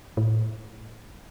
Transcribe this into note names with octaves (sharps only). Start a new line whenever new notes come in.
A2